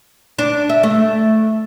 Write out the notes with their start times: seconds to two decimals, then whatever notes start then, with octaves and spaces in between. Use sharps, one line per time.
0.39 D4
0.69 E5
0.83 A3